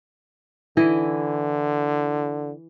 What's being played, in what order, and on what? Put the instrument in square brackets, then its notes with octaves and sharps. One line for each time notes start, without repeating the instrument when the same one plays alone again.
[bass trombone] D3 [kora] E3 E4 D#5